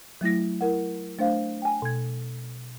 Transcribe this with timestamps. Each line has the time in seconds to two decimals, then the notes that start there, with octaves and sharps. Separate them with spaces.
0.21 F#3 A3 E4 A#6
0.61 E4 A#4 F#5
1.19 A3 D4 C5 F5
1.62 G5 G#5
1.82 B2 G#6